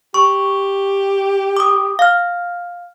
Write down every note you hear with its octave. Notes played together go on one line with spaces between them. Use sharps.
G4 C#6
D6 D#6
F5 F6